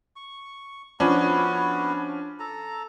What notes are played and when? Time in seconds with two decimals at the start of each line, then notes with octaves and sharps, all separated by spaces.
0.16 C#6
1.00 F3 B3 C#4 D4 E4 F#4
2.40 A4 A#5